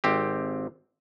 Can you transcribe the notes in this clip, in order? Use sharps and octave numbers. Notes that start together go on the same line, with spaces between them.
G#1 C4 G4